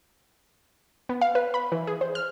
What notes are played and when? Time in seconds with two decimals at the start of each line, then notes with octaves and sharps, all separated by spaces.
1.09 B3
1.21 F5
1.35 B4
1.54 B5
1.72 E3
1.87 G#4
2.01 C5
2.15 F6